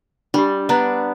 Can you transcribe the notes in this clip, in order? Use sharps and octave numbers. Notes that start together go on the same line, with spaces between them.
G3 D4 G4
B3 D4 D5 A#5